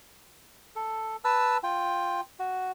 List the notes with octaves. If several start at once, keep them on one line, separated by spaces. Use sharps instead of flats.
A4
B4 A5 E6
F4 G5
F#4